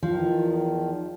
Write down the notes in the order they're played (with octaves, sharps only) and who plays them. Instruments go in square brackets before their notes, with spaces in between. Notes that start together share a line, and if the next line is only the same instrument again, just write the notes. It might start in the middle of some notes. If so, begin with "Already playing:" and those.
[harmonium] E2 D#3 [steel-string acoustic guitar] F3